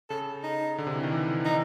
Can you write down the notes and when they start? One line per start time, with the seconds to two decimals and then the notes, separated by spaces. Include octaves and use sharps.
0.10 C#3 A4
0.43 D#4
0.78 D3
0.87 C3
0.95 E3
1.03 D#3
1.12 E3
1.45 D#4